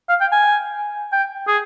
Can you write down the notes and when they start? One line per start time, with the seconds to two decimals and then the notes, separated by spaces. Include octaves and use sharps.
0.09 F5
0.21 G5
0.32 G#5
1.12 G5
1.47 G#4